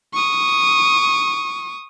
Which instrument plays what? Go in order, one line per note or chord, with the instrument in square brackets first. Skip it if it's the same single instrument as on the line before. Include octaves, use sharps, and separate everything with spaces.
[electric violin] C#6 D#6